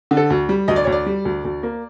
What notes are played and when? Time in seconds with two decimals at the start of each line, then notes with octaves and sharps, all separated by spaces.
0.11 D3
0.17 A4
0.30 D2
0.49 G3
0.68 D2 D#5
0.76 D5
0.84 D2 C#5
0.92 D5
1.06 G3
1.25 D2
1.44 D2
1.63 A#3